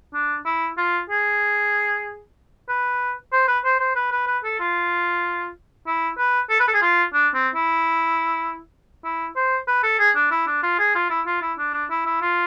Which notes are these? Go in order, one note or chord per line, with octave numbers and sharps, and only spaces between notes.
D4
E4
F4
G#4
B4
C5
B4
C5
C5
B4
B4
B4
A4
F4
E4
B4
A4
B4
A4
G#4
F4
D4
C4
E4
E4
C5
B4
A4
G#4
D4
E4
D4
F4
G#4
F4
E4
F4
E4
D4
D4
E4
E4
F4